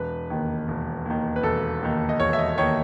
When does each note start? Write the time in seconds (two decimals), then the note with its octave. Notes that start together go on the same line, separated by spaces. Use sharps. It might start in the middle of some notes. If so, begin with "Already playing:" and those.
Already playing: E1 B4
0.30 D#2 D#3
0.68 E1
1.06 D#2 D#3
1.36 B4
1.43 E1 A4
1.82 D#2 D#3
2.09 D#5
2.20 E1 C#5
2.33 E5
2.39 D#5
2.58 D#2 D#3 C#5